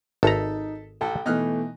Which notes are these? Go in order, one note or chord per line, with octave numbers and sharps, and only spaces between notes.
G#1 D#4 A4 E5 A5 A#5
A1 A4 G5
B2 E3 A3 D#4 F6 F#6